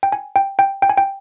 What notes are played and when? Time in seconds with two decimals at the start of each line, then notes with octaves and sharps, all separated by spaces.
0.03 G5
0.12 G#5
0.36 G5
0.59 G5
0.82 G5
0.89 G#5
0.98 G5